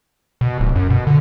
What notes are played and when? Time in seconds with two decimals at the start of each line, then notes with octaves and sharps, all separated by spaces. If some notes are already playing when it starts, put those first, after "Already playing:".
0.41 B2
0.60 D1
0.75 F#2
0.90 B2
1.07 D3